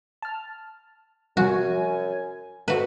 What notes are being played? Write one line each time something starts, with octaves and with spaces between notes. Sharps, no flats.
A5 F6
F#2 C3 F3 G3 F#4 G#5
F2 F#4 B4